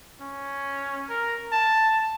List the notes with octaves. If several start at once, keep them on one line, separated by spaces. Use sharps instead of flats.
C#4
A#4
A5